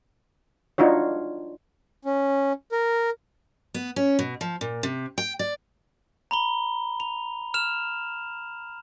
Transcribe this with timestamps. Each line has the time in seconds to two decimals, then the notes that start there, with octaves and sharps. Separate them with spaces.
0.78 D4 D#4 F4 F#4 C#5
2.05 C#4
2.72 A#4
3.74 B3
3.96 C#4
4.19 B2
4.41 F3
4.61 A#2
4.83 C3
5.18 G5
5.39 D5
6.31 A#5 B5 G7
7.00 F7
7.54 F6 E7 F7